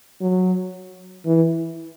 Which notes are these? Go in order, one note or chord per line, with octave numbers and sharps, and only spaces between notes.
F#3
E3